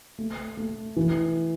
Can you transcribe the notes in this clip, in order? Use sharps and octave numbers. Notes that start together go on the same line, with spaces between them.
A3
A3
E3